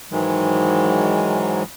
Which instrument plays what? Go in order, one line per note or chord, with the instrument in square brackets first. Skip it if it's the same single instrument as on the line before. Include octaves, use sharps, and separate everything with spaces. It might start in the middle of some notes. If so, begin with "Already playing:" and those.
[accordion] G#2 D#3 E3 F#3 G#3